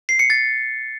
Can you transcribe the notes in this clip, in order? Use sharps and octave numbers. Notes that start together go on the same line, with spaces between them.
C7
C#7
A6